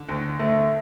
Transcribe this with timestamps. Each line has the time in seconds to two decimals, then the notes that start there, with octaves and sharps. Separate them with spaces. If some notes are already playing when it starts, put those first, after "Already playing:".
Already playing: D3
0.09 D2
0.39 D2 A3